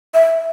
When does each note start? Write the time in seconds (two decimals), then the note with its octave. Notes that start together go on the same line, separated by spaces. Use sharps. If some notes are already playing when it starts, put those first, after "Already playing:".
0.14 E5